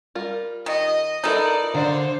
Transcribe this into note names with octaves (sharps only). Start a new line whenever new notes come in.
G3 F4 A#4
D#3 D#5
E3 D#4 F4 A4 A#4 D5 E5
D3 C5 D5 F5 A#5